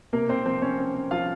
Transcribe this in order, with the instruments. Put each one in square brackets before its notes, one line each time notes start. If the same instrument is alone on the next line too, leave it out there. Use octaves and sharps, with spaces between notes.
[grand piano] C3 A#3 A#4
C3 C4 C5
F3 C4 C5
C4 C#4 C#5
C4
C4
F3 F4 F5